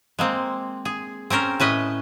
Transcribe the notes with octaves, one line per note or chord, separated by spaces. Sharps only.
G#3 A#3 C4
G#4
C4 C#4 A#4 C5
A2 C#4 B4 D#5